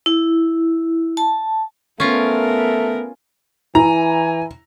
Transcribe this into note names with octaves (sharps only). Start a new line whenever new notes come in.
E4
A5
A3 B3 C#4 F4 A#4
E3 E4 G#5 A#5